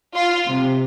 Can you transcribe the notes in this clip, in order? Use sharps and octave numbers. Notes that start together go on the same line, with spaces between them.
F4
C3